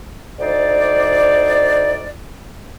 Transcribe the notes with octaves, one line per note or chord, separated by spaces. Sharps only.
D2 D#4 C5 D5